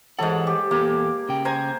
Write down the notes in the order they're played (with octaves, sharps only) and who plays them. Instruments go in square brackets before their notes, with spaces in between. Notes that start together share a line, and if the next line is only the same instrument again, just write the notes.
[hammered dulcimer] G#2 A4 [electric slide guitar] E3 C#5 F#5
[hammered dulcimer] G4
[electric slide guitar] E2 G4 A4 [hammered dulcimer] A#3
[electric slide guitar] C#3 G5
[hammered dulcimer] C5 G#5 A#5